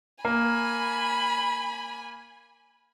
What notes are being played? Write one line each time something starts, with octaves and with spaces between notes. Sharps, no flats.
A#3 G#5 B5